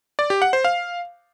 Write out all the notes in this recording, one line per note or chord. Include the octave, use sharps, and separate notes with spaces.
D5
G4
F#5
C5
F5